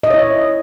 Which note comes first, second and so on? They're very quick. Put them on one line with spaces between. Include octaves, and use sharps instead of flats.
D#5 E5 C#5 E4